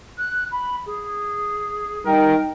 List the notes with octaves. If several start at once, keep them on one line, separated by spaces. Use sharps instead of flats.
F#6
B5
G#4
G3 D#4 A#4 G5